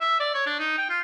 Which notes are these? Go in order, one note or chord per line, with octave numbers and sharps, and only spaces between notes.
E5
D5
C#5
D4
D#4
G5
F4